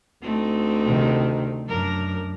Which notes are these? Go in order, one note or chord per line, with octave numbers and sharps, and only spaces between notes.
D2 A3 C4 D#4
C3 D#3
F#2 D4 A#4